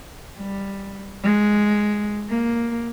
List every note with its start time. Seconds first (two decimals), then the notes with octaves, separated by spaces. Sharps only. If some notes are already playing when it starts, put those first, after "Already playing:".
0.38 G3
1.24 G#3
2.30 A#3